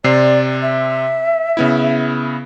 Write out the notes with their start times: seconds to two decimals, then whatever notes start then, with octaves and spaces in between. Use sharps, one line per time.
0.04 C3 C4 D5 C7
0.62 E5
1.57 C#3 B3 E4